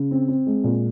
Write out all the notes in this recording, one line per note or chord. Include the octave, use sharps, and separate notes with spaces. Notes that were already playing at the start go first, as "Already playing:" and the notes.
Already playing: C#3
C4
C4
G#3
A#2